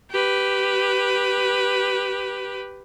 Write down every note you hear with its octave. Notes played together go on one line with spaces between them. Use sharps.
G4 B4